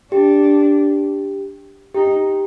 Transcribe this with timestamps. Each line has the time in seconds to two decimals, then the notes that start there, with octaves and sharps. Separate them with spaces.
0.12 D4 G4
1.95 D#4 G4